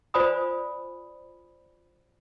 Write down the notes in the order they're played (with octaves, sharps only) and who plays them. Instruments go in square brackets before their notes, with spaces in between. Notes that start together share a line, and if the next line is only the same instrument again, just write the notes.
[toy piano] F4 C5 D5 G#5 B5 D#6